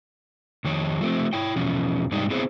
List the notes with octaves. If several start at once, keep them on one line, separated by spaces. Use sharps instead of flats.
F2 D#3 C#5
F3 A3 C4
E4 C#5 G5
E2 B2 F3 C#4
G#2 C3 G3 D4 D#4 G4
B3 C4 E4 G#4 C5 C#5